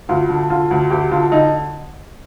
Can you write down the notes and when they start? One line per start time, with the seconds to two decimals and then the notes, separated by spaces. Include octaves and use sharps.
0.09 D2 F4
0.29 D3
0.50 D3 F4
0.71 D2
0.90 D2 G4
1.11 D3 F4
1.32 D3 D#4